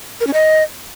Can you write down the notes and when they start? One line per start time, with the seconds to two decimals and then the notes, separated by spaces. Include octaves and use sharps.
0.21 A#4
0.27 C#4
0.34 D#5